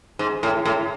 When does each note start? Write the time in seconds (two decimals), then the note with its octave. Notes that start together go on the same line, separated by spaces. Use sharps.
0.19 G#2
0.43 A2
0.65 A2